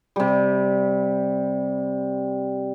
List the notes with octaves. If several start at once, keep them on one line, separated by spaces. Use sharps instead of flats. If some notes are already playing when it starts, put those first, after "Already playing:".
C3 G3